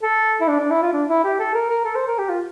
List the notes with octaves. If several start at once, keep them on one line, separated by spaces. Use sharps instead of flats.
A4
E4
D4
D4
E4
F4
D4
E4
G4
A4
A#4
A#4
A4
C5
A#4
G4
F4